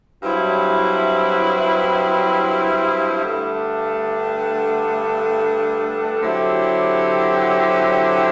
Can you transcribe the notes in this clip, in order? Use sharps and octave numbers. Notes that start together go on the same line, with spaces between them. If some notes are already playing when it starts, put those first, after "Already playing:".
G2 F#3 C4 E4
G2 D3 A3 D4
D3 F#3 C4 E4 G4